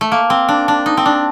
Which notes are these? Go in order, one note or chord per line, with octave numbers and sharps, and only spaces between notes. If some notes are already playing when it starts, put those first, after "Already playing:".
A3
A#3
C4
D4
D4
D#4
C4
D4